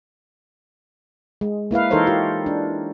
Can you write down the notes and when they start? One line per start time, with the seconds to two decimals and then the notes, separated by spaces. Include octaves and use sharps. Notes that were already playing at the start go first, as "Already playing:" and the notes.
1.41 G#3
1.71 A#3 E4 B4 F5
1.91 E3 D#4 A4 A#4 C5 C#5
2.06 F4 G4
2.46 D4